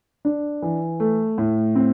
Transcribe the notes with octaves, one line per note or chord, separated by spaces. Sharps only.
D4
E3
A3
A2
C4